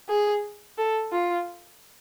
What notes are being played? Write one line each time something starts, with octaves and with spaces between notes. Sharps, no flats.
G#4
A4
F4